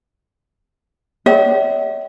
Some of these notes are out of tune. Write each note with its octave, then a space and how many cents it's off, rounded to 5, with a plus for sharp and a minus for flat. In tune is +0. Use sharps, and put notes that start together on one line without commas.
C#5 +45 E5 -45 G5 -40